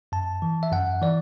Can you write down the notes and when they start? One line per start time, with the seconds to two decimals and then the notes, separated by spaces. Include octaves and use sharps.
0.12 F#2 A5
0.42 E3
0.63 E5
0.72 F#2 F#5
1.02 E3 D5